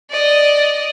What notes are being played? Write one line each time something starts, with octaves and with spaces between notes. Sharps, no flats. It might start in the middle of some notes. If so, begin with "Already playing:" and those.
D5 D#5